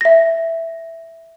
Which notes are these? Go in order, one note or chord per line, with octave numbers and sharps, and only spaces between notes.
E5 A#6